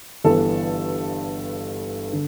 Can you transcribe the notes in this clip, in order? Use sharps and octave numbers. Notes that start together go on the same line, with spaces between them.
G1 G2 E3 A4
D3